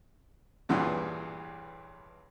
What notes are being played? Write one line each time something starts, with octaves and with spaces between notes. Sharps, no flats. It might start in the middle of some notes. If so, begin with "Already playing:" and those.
B1 E2 G2 A#2 E3 B3